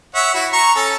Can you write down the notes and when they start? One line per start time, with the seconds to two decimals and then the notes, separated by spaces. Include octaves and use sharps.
0.15 C#5 E5 F#5
0.34 E4 F#4
0.53 A#5 C#6
0.76 C#4 A4